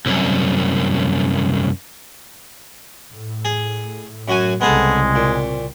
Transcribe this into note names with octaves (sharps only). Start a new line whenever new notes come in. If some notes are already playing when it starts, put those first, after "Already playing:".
C2 F#2
A2
G#4
F#2 F#4 G#5
C2 C#3 G#3 B3 C4 G#4 A4
A#2